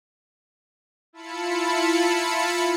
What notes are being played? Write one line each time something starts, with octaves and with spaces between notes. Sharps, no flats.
E4 F4 A5 B5 C#7